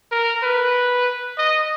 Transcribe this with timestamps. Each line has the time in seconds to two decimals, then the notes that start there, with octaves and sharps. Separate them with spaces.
0.12 A#4
0.43 B4
1.38 D#5